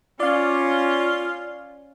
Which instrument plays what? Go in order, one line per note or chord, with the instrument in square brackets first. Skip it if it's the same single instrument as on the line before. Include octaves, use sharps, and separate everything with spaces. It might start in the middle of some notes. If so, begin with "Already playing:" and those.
[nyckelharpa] C#4 [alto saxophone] F4 [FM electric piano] D5 F5